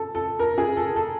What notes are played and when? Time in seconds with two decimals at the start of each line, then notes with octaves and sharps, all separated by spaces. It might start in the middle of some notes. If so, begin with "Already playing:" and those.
Already playing: A4
0.15 A4
0.39 A#4
0.58 G#4
0.77 A4
0.96 A4